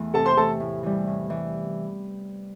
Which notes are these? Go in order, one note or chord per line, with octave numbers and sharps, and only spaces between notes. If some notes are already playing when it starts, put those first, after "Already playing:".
Already playing: E2 E3 A3 E4
C3 A4 A5
C5 C6
E3 A3 A4 A5
A2
E3 G3
A2
E3 G3